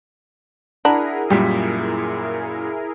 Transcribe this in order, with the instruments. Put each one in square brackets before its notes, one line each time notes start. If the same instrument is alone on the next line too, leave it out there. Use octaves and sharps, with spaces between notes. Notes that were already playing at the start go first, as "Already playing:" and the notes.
[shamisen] D4 [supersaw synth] E4 G#4 A#4 [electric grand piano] F#5 A#5 B5
[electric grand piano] F#2 A#2 B6 [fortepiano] G3